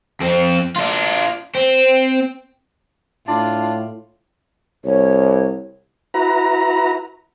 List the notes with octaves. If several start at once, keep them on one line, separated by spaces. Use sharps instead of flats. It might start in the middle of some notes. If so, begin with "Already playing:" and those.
F2 C4
D4 F4
C4
A2 D4 F4
C2 C#5
E4 F#4 B4 A#5